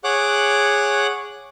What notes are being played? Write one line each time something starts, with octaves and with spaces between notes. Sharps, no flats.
G#4 C#5 F#5 D6 F#6